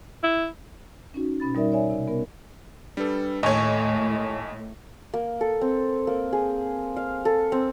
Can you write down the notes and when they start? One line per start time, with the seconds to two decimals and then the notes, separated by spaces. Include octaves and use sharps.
0.23 E4
1.14 C#4 D#4 F#4
1.40 B2 C#4 B5 A6
1.55 G3 C#4 D#4 A#4 D5 E5
1.72 C#5 D5 E5 G#5
1.90 C3
2.08 B3 A#4
2.97 G3 D4 A4 B4
3.43 D#2 A2 A3 C#5 D#5 G#5 C#6
5.14 A#3
5.41 A4
5.61 C4
6.07 A#3
6.33 G#4
6.96 F5
7.25 A4
7.52 C4